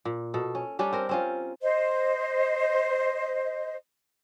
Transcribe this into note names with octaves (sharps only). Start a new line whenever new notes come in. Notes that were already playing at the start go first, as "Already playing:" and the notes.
A#2
B2 A4
C#4
G3 C#4 D4 G4
C4 A#4
C4 C#4 F4
C5 D#5